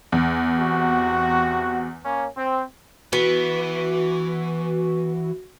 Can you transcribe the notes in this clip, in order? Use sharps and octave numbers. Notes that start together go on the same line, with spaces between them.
E2
C3 F#4
A#3 C#4
C4
E3 B3 F#4